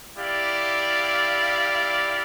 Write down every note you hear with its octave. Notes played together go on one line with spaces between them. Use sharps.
E4 G4 D5 F5